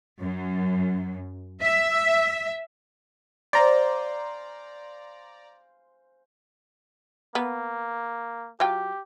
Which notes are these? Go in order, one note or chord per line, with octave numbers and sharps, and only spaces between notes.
F#2
E5
C5 D5 F5 G#5 A#5
A#3 B3
F#3 F4 G4 G5